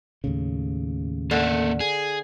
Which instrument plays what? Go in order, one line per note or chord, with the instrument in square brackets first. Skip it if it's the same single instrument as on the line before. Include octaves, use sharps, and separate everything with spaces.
[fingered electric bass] D#2 A2 C#3
[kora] D3 [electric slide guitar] A#3 A4
[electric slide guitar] G#4